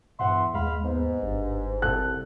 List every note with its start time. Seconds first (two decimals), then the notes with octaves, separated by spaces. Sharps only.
0.20 E2 G2 E5 F#5 C6
0.54 D#2 G#3 F5 B5
0.84 G#2 B3
1.22 G1 G2
1.82 C2 A4 F#6